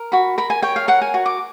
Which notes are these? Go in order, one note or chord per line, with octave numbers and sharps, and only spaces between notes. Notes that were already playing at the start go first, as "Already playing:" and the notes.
Already playing: A#4
F#4 B5
A#4 B5
G#5
C#5 G5
F5
A#4 F#5
G#5
F#4
D6